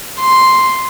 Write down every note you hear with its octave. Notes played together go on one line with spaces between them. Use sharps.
C6